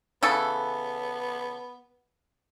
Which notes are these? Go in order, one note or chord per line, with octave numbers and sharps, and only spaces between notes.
C#3 E3 B3 A4